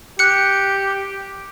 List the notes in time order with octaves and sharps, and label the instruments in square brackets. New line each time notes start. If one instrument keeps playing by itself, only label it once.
[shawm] G4 [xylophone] F#6 C#7